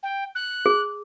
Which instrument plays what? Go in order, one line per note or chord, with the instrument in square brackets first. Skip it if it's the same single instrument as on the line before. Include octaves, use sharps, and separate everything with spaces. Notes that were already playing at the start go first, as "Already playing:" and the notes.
[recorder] G5
F#6
[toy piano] G#4